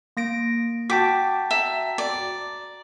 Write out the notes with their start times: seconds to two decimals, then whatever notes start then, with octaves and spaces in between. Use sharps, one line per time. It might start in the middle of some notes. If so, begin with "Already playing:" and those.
0.17 A#3 A#6 D7
0.90 F#4 G5 A5 D6 B6
1.51 E5 A#5
1.98 D5